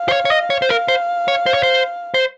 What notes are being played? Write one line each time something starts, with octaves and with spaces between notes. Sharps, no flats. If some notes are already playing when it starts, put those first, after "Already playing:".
Already playing: F5
C5
C#5
C#5
D#5
C#5
C5
A#4 F5
C5
C#5
C5
C#5
C5
C5